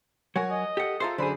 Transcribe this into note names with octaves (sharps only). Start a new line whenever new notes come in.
F#3 A#4 C#5 F#5 G#5
D#5
G4 A4 F#5
F4 G#4 A4 C5 E5 A#5
F#2 D3 G#4 C5 D5 B5